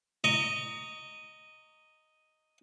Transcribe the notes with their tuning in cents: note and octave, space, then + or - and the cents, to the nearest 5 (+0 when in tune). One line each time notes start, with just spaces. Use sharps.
D#5 +0 A#5 -15 C#6 +30